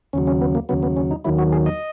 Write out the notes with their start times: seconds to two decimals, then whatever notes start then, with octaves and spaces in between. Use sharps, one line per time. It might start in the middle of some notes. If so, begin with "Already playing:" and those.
0.13 D#2 C#3 F#3 C#4
0.27 C#4
0.41 B3
0.55 A#3
0.69 D#2 C#3 F#3 B3
0.83 B3
0.96 C#4
1.11 D#4
1.24 D#2 D#3 F#3 E4
1.38 F#4
1.52 G#4
1.66 D#5